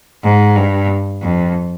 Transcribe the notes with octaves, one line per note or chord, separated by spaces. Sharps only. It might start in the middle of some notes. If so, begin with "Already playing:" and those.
G#2
G2
F2